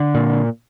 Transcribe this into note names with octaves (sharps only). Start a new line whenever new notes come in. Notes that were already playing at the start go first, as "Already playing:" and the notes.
Already playing: D3
A#2